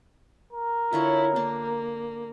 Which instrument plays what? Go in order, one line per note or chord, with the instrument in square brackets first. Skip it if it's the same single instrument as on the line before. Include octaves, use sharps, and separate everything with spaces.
[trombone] A#4
[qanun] D3 F4 C#5 [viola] E4
[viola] A#3 [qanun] D4